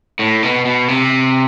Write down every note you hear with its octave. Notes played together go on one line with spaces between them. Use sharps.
A2
B2
B2
C3